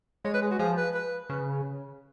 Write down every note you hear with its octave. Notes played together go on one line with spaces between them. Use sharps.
G#3 C#5
B4
G#4
F#4
F3 G#4
B4
B4
C#3 B4